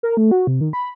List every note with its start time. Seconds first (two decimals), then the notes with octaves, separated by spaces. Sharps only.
0.03 A#4
0.17 A3
0.31 F#4
0.47 C3
0.61 D#3
0.73 B5